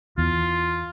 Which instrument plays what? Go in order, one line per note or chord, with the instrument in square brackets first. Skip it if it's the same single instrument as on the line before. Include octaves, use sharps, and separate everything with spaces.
[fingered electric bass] E2 [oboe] F4